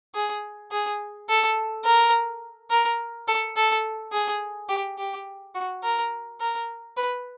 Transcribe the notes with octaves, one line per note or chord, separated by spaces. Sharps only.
G#4
G#4
A4
A#4
A#4
A4
A4
G#4
G4
G4
F#4
A#4
A#4
B4